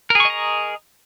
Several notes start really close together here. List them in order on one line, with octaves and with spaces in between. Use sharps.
A#4 G#4 C#6 D#5 A#5